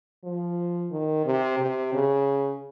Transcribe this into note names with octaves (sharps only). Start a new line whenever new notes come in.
F3
D#3
C3
C3
C#3